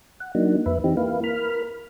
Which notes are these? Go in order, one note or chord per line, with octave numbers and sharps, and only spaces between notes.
F#5
F#3 A#3 D4 D#4
F2 B4 E5
E3 C4 D#4 G4
A#3 E4 B4 F5
A#4 B5 F6